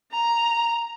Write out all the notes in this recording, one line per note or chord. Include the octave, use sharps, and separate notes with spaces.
A#5